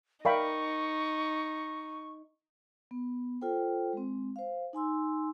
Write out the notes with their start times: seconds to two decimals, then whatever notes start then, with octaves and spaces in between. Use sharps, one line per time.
0.25 D#4 A#4 D5 E5 F5 G5 B5 C#6
2.91 B3
3.42 F4 A4 C5 G5
3.93 G#3 C4
4.36 C5 F5
4.73 D#4 G#5 C6 E6